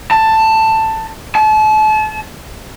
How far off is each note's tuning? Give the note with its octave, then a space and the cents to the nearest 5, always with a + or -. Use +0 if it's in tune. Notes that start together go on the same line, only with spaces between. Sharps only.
A5 +10
A5 -35